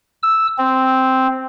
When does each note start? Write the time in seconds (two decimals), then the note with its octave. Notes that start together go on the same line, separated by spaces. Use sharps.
0.23 E6
0.58 C4